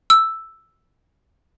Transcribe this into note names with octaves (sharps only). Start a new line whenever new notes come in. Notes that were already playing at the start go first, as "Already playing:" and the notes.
E6